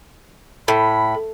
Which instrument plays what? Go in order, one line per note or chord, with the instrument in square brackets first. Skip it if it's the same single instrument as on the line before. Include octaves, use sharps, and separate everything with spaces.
[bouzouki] A2 [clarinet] B5